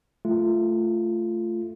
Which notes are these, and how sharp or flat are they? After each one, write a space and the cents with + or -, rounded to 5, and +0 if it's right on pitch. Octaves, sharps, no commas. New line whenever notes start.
A3 +0 F4 -15